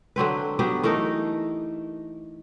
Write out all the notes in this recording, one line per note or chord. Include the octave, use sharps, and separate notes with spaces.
D3 F#3 C4 B4
F#3 B3 G4
E3 A3 D#4 A#4